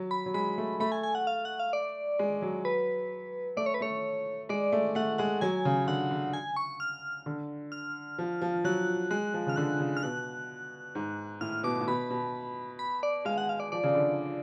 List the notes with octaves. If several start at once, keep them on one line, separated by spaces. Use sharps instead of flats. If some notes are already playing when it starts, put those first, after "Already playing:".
Already playing: F#3
B5
F#3
G#3 B5
A3
A3 B5
G#5
G#5
F#5
F5
F#5
F5
D5
G#3
F#3
B4
A3 D5
C#5
B4
A3 C#5
G#3 D5
A3
A3 F#5
G#3 F#5
F#3 G#5
C#3
D3 F#5
D3
G#5
C#6
F6
D3
F6
F3
F3
F#3 F#6
G#3 F#6
F3
C#3 F6
D3 F#6
C#3
F6
B2 F#6
G#2
A2 F6
B2 D6
A2
B2 B5
B2
B5
D5
G#3 F5
F#5
F5
D5
F3 D5
C#3
D3